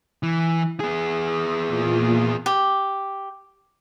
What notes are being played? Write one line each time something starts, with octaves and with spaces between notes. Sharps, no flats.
E3
B3 G#4
A#2 F4
G4